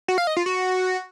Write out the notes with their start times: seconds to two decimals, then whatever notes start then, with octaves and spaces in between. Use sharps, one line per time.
0.08 F#4
0.18 F5
0.27 D#5
0.37 F4
0.46 F#4